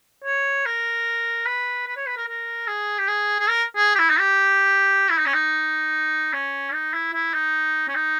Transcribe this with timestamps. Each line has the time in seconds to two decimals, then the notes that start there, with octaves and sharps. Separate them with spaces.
0.24 C#5
0.66 A#4
1.46 B4
1.87 B4
1.97 C#5
2.06 B4
2.17 A#4
2.27 A#4
2.67 G#4
2.98 G4
3.08 G#4
3.39 G#4
3.49 A#4
3.76 G#4
3.95 G4
3.99 E4
4.10 D#4
4.19 G4
5.10 E4
5.18 D#4
5.26 C#4
5.34 D#4
6.33 C#4
6.73 D#4
6.93 E4
7.13 E4
7.34 D#4
7.88 C#4
7.95 D#4